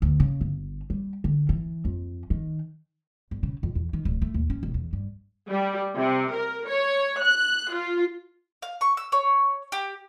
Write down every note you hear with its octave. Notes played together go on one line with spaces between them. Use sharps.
D2
C#3
G1
G3
D3
E3
F2
D#3
G1
C#3
F2
E2
D#3
D1
A3
D#2
C#4
E1
E2
G2
G3
C3
A#4
C#5
F#6
F4
F5
C#6
E6
C#5
G4